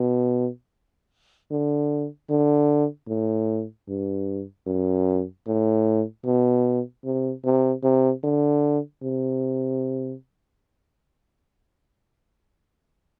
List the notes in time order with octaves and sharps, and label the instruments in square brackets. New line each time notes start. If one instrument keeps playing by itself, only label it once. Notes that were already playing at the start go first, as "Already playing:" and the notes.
Already playing: [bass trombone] B2
D3
D3
A2
G2
F#2
A2
B2
C3
C3
C3
D3
C3